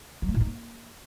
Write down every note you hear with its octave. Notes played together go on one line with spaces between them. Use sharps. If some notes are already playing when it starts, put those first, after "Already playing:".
F#3
A3
A2
D#4
A#3